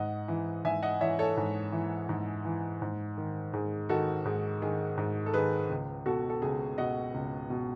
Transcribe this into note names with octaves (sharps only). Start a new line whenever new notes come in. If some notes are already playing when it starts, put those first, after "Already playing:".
Already playing: G#2 D#5 F#5
E3
G#2 E5 G#5
D#5 F#5
E3 C#5 E5
A4 C#5
G#2
E3
G#2
E3
G#2
D#3
G#2 G#4
D#3 F#4 A4
G#2 G#4
D#3 G#4
G#2 G#4
A4
D#3 G#4 B4
C#2
B2 F#4 A4
A4
C#2 G#4
B2 D#5 F#5
C#2
B2